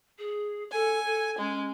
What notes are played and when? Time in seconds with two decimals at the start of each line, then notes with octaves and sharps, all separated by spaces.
0.18 G#4
0.72 A4 G#5
1.05 A4
1.38 G#3 C#4